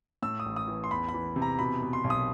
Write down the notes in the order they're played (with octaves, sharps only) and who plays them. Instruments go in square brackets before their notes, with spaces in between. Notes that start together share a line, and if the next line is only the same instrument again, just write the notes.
[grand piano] A2 E6
D#6
A1
D#6
E3
C6
E2 B5
B5
E3
C3
A#5
B2 B5
B2
C6
B1
D#6